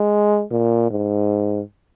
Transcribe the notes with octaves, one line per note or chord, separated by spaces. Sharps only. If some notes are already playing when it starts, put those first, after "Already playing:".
Already playing: G#3
A#2
G#2